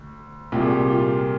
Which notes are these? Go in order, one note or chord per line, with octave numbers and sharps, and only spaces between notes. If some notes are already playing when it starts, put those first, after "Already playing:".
Already playing: D2
C2 A#2 G4
G#4
G4
F4